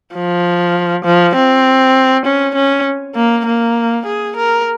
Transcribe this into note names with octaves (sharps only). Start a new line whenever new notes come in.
F3
F3
C4
C#4
C#4
A#3
A#3
G#4
A#4